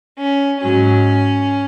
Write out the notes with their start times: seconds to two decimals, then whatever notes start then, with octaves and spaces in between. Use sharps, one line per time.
0.18 C#4
0.61 G#2 F#3 C#4